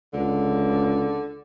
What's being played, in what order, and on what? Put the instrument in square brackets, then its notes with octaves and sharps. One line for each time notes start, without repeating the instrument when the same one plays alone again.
[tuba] C#2 [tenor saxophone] D3